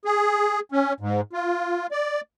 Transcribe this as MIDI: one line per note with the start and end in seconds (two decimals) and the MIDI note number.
0.05 0.60 68
0.72 0.93 61
1.00 1.21 44
1.33 1.87 65
1.91 2.21 74